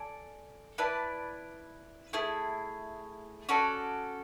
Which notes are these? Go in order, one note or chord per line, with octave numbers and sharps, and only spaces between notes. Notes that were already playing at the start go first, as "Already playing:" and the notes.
Already playing: A4 D5 G#5
E4 B4 D5 A5
A3 E4 G#4
C#4 F#4 A4 D5